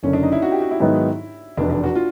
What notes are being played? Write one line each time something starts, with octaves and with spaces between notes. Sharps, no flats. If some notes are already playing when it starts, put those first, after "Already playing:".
F#1 F#2 D3 C#4
D4
D#4
E4
F#4
G4
F#4
E4
G#2 D#3 F#3 B3 D#4
F1 E2 B2 D4
D4
F#4
F4